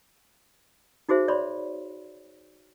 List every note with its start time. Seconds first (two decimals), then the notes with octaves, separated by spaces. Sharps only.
1.09 D#4 F#4 G#4 C5 E5
1.28 C#5 D5 B5 C6